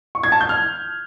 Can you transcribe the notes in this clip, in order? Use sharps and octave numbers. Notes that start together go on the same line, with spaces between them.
C#6
G#6
A5
G6
F6